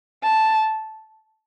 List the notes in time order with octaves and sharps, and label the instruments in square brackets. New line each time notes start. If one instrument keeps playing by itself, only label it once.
[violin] A5